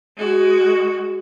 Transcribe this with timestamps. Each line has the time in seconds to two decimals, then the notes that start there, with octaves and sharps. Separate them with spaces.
0.17 G#3 F#4